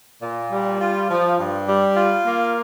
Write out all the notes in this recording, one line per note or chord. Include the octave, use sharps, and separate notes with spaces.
A#2
G3
F4
F3
G2
G3
F4
A#3